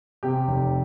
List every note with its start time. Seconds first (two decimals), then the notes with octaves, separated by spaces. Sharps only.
0.23 C3 G4
0.47 F1